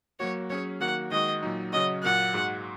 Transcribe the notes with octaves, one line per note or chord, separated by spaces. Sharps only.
F#3 A#3 F#4 C#5
F#3 C#4 G#4 C#5
D#3 F#3 A#3 F#4 F#5
D#3 G#3 F#4 D#5
A#2 F#3 D#4
C#3 F#3 C#4 F#4 D#5
A#2 F#3 A#3 F#5
G#2 G#3 F#4